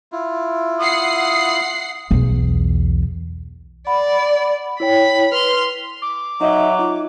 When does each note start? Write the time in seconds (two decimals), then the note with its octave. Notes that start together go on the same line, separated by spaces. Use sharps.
0.12 E4 F4
0.80 F#5 D#6 C7
2.11 B1 E2
3.87 D5 F#5 B5
4.80 E4 C#5 G5 B5
5.32 B4 C6 F6
6.01 D6
6.41 F#3 D#4 D#5 E5
6.79 D#4 F4